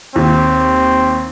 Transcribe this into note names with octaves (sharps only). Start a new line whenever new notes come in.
D#2 C4